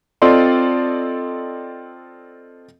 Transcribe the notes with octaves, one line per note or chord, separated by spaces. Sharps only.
C4 F4 A4 D5 D#5 C6